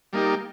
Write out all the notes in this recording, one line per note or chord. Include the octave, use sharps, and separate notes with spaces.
G3 A#3 D#4 G4